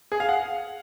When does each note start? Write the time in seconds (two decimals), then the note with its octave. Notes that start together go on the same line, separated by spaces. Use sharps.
0.12 G#4
0.20 F5
0.29 F#5